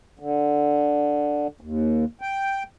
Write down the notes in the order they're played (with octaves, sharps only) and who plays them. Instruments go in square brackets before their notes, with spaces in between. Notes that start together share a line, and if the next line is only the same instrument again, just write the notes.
[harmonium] D3
D#2
G5